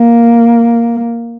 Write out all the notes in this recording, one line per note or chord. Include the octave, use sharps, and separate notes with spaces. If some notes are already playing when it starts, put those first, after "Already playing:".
Already playing: A#3